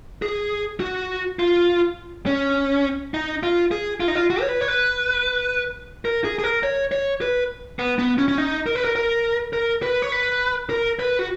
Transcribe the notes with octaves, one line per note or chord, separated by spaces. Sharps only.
G#4
F#4
F4
C#4
D#4
F4
G#4
F4
D#4
F4
F#4
C#5
B4
C#5
B4
A#4
G#4
G#4
A#4
C#5
C#5
B4
B3
B3
C#4
C#4
D#4
A#4
B4
A#4
A#4
A#4
B4
C#5
B4
A#4
B4
F#4